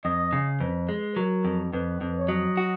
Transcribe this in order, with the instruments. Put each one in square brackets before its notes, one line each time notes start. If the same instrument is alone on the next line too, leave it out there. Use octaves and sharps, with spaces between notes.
[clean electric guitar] F2 [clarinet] D#5
[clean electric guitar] C#3
[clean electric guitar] F2 [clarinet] B4
[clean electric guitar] G#3
[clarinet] B4
[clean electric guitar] F#3 [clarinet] A#4
[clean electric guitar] F2
[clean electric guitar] F2 [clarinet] B4
[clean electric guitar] F2
[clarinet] C#5
[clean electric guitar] F#3 [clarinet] D#5
[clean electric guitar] F#4